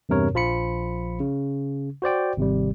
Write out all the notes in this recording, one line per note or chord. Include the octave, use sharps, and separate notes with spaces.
E2 G2 C3 A#4 C#5
A#1 F3 F4 B5 C#7
C#3
F#4 C5 D5 G5
G#1 C3 G3